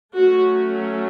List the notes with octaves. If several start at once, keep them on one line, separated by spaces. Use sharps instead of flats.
F#3 A3 C#4 F#4